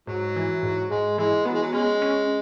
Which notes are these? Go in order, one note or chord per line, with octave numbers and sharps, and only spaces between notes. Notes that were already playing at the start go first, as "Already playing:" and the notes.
G#2 F#3
E3
G#2
G#2 G#3
E3 G#3
F#3 B3
G#3
F#3
G#3 C#4
C#4